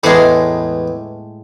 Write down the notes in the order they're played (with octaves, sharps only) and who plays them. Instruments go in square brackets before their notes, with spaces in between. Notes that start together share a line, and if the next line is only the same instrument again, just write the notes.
[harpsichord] E2 B4 D6 [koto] A2 G#3